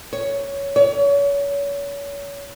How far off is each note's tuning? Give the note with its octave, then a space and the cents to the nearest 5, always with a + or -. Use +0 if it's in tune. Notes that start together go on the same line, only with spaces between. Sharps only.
C#5 +10
C#5 +35